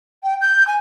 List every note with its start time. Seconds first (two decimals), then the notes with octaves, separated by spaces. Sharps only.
0.23 G5
0.41 G6
0.67 G#5